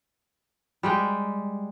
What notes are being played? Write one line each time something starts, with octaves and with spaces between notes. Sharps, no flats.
G3 G#3 G5